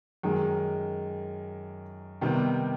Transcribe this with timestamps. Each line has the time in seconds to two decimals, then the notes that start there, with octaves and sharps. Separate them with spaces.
0.23 F#2 D#3 G#3
2.21 C3 D#3 G3 B3